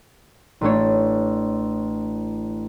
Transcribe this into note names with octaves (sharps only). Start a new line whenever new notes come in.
A1 A3 D4 C#5